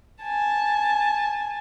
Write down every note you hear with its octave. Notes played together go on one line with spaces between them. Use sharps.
G#5 A5